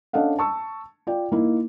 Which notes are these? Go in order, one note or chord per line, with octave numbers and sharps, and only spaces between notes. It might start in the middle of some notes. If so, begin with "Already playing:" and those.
C#4 D4 A4 D#5 F5 F#5
A5 C#6 E6
F4 D5 G5
A#3 D#4 E4